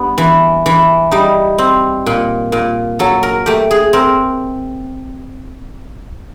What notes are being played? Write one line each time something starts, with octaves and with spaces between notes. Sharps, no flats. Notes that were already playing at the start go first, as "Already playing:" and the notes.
Already playing: G3 B3 D4
E3
E3
G3 D#4
C4
A#2
A#2
F#3 A4
A#4
A3 G4
G#4
C4 A#4